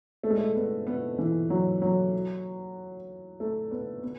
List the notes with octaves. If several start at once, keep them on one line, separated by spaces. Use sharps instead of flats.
A3
G#3
A3
B3
B3
E3
F#3
F#3
A3
B3
B3